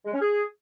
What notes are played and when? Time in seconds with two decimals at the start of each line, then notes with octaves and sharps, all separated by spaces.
0.05 G#3
0.14 C#4
0.22 G#4